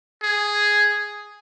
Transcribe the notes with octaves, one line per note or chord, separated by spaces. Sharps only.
G#4